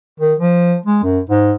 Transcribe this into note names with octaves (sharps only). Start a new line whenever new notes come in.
D#3
F3
G#3
F#2
G#2